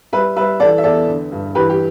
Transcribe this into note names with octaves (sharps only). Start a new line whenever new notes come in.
G3 B4 E5
G3 B4 E5
E3 A4 D5
E5
E2 A4 D5
D3
G2
E3 G4 B4
G4